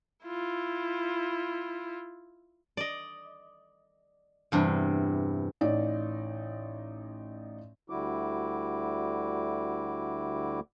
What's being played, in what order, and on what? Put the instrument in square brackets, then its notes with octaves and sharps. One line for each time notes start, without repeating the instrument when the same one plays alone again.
[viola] E4 F4
[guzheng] D5 D#5
E2 G2 C3
[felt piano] A1 D#4 D5
[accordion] D2 D3 G3 E4 F#4 D6